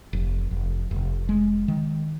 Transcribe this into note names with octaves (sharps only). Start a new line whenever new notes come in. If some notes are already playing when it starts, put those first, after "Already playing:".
F1
F1
F1
G#3
D#3